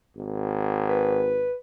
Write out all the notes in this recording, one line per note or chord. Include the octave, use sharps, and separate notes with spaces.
G#1
B4